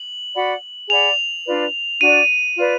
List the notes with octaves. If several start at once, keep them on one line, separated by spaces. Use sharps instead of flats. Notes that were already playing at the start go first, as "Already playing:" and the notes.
Already playing: F#7
F#4 D5 F#5 B5
G#4 D5 F#5 B5 F7
D4 F4 B4 D5
D4 F#4 D5 D#7
F4 B4 D5